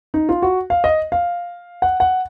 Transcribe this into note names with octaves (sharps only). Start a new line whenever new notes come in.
D#4
F4
F#4
F5
D#5
F5
F#5
F#5